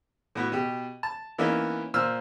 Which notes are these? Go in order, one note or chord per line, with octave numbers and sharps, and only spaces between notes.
A2 B3 F#4
B2 G4
A5
E3 A#3 B3 C#4 D#4
A#2 C5 E6 F6